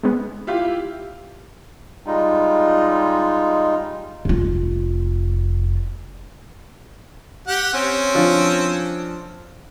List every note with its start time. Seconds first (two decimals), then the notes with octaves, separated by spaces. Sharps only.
0.03 G#3 B3
0.47 E4 F4 G4
2.06 G3 G#3 D#4 F4
4.25 F1 F4
7.48 G4 F#5
7.74 C4 C#4
8.14 F3 D4 F4